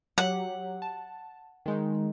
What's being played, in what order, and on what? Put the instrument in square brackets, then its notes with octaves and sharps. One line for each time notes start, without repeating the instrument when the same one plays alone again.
[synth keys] F#3 G4 [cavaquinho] F#5
[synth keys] A5
D#3 G#3 D#4